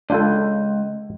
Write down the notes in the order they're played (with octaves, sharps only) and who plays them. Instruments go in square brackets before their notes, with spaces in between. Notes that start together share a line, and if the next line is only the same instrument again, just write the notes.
[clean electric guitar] C#2 [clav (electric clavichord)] D4 F4 A4